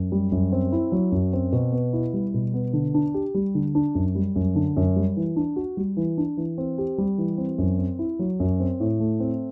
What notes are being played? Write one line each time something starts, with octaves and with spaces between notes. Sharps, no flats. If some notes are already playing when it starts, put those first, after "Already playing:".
Already playing: F#2
G3
F#2
C4
E4
F#3
F#2
C4
B2
B3
E4
G3
B2
B3
D3
D4
G4
G3
D3
D4
F#2
G3
F#2
D3
F#2
G3
E3
D4
F#4
G3
E3
D4
E3
C4
G4
G3
E3
C4
F#2
C4
E4
F#3
F#2
C4
A2
A3
C4